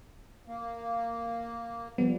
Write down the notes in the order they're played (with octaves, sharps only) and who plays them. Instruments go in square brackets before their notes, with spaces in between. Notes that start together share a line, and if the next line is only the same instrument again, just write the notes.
[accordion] A#3
[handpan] F3 G3 [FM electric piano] B3